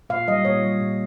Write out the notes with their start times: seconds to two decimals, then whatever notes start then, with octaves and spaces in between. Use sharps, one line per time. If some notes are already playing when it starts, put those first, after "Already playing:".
0.10 A#2 F5
0.27 G3 D#5
0.45 A#2 C#5
0.63 G3
0.80 A#2